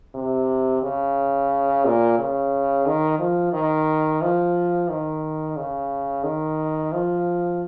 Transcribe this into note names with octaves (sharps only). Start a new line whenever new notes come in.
C3
C#3
A#2
C#3
D#3
F3
D#3
F3
D#3
C#3
D#3
F3